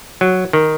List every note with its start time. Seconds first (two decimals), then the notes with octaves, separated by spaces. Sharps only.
0.21 F#3
0.53 D#3